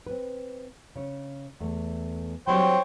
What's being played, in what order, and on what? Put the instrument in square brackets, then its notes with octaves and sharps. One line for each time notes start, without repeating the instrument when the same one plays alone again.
[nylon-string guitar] C4 B4
C#3 C#5
E2 A3
[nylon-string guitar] F#3 G3 C4 [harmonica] C5 C#5 G5